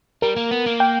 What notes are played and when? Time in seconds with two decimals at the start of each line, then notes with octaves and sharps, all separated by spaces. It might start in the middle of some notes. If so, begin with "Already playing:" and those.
0.22 G3 A#4
0.36 A#3
0.51 B3
0.66 A#3
0.80 G5